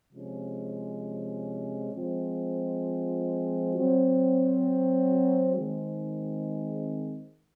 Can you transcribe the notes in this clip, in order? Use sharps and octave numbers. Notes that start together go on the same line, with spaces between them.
C3 F3 G#3 C#4
F3 G#3 C4 F4
F#3 C4 F#4
D#3 G#3 C4